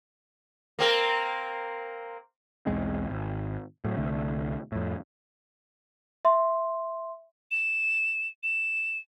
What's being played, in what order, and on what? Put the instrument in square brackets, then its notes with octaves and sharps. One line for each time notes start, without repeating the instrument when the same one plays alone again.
[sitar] A#3 C4 A#4
[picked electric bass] B1 E2 G#3 C4
G#1
A2 F#3
C2 D3 A3
F2 A2
[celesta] E5 C6
[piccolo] E7
E7